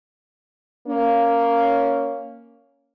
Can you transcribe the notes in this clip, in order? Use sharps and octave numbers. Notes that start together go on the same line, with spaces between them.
A#3 C#4